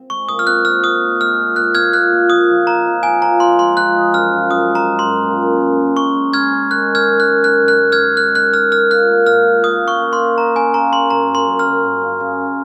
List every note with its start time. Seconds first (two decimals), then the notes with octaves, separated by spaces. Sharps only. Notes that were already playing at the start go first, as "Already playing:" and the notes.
Already playing: C4
0.10 G#3 C#6
0.28 A#2 D#6
0.39 F6
0.46 C4 F#6
0.65 A#2 F6
0.84 A#2 D#6
1.02 D#4
1.20 G#3 F6
1.38 A#2
1.56 A#2 F#6
1.75 A#2 F6 G#6
1.93 A#2 F#6
2.12 A#2
2.30 F3 D#6
2.49 F3
2.67 D#4 A#5
2.85 F3
3.03 D#4 G#5
3.22 F3 A#5
3.40 D#4 C6
3.59 G#3 C6
3.76 F3 F#6
3.95 D#4
4.13 F#2 F6
4.32 F3
4.50 F#2 D#6
4.69 G#3
4.75 A#5
4.87 D#4
4.99 C6
5.06 F#2
5.24 A#2
5.42 C#4
5.60 C#4
5.79 G#3
5.97 C#4 C#6
6.15 G#3
6.34 G#3 F6 G#6
6.52 C#4
6.70 D#3 F#6
6.88 D#3
6.95 F6 G#6
7.08 F#2
7.20 F#6
7.25 G#3
7.44 D#3 F#6
7.62 F#2
7.68 F#6
7.80 G#3
7.92 F6 G#6
7.98 F#2
8.17 D#3 F#6
8.35 D#3 F#6
8.54 D#3 F6
8.72 D#3 F6
8.90 F4 F#6
9.09 A#3
9.26 G#2 F6
9.46 F4
9.64 A#3 D#6
9.82 C#4
9.88 C#6
10.01 A#3
10.13 C6
10.19 D#5
10.37 D#5 A#5
10.55 C#4 G#5
10.74 A#3 A#5
10.92 G#4 C6
11.10 F#2 A#5
11.29 F#2
11.35 C6
11.47 F#2
11.59 F6
11.66 F#2
11.84 F#2
12.02 C#3
12.20 C#3